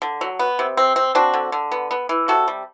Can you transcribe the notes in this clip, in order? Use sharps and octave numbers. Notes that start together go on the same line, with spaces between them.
D3
F#3
B3
C3
C4
C4
C4 D4 F#4
D3
D3
B3
B3
E3
C3 F#4 A4
G3